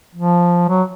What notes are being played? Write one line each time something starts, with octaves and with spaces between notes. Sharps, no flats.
F3
F#3